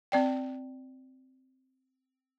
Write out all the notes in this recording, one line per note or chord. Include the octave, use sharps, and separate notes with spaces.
C4 D5 G5